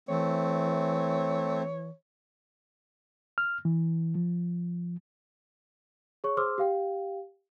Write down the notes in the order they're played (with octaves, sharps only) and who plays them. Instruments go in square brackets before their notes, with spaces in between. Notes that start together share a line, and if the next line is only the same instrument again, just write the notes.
[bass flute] E3 [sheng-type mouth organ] A3 C4 [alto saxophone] C#5
[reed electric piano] F6
E3
F3
[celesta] G#4 C#5 C#6
G#4 C5 C6 D6 E6 F6
G4 F5 G5